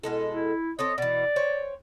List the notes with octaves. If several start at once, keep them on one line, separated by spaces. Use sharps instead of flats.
B2 G#3 E4 A4
E4
C4 A4 C#5 D#5
B2 E3 D5
C5 C#5 G5